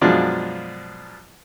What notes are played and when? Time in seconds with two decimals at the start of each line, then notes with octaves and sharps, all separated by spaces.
0.01 F#2 B2 F3 G#3 D4 F4